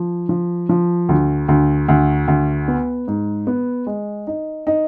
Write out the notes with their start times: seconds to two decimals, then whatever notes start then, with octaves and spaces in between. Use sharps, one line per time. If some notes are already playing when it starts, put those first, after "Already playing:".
Already playing: F3
0.29 F3
0.69 F3
1.09 D2
1.48 D2
1.88 D2
2.28 D2
2.68 B3
3.08 G#2
3.47 B3
3.87 G#3
4.27 D#4
4.67 D#4